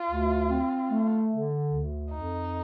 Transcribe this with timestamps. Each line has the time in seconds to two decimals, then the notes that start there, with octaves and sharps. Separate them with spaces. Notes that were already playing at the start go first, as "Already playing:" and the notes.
Already playing: F4
0.09 D2
0.50 C4
0.90 A3
1.30 D3
1.70 D2
2.11 F2 D#4